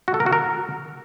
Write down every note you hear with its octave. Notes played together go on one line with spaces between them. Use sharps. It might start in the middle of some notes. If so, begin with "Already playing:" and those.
F#4
A4
A#4
F#4
A#4